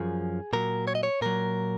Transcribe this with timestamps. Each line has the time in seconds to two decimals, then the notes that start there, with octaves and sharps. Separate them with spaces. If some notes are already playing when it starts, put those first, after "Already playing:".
Already playing: F#2 F3 G#4
0.53 A#2 F#3 A#4
0.87 C#5
0.95 D#5
1.03 C#5
1.21 A#2 F#3 A#4